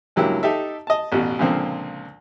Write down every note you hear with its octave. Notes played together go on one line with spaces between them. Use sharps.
C#2 G2 F#3 A#3 E4 G4
D#4 G4 A4 E5
D#5 A5
A1 E2 B2
C#2 A#2 D3 F3 C4